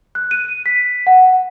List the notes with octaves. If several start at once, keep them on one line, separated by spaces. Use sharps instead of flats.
F#6
D#7
B6
F#5